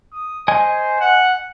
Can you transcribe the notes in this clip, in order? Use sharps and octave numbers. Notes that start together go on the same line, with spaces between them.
D#6
C5 D#5 G#5
F#5